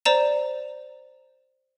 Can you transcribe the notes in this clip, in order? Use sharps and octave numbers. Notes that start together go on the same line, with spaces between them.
C5 D5 A#5 E7